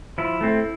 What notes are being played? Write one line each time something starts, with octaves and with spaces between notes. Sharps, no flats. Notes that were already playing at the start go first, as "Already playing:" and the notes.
F3 E4
A3 C4